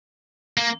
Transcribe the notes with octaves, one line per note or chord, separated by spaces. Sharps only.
A#3